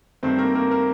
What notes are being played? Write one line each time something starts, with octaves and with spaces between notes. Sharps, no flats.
G2 D#3 A3 C4 C5
A#3 A#4
A#3 A#4
A#3 A#4